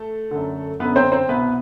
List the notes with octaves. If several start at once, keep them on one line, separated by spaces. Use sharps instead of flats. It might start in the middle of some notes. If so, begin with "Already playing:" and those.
Already playing: A3 A4
F#2 D3
F#2 D3 B3 B4
C4 C5
C4 C5
C2 B2 B3 B4